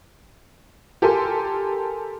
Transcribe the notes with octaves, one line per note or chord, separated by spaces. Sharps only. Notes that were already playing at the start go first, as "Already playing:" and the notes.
G4 A4 A#4 G#5 C6